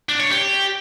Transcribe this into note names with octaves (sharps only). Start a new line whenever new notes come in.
D4
C#5
G4